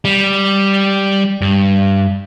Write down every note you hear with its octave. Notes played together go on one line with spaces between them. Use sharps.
G3
G2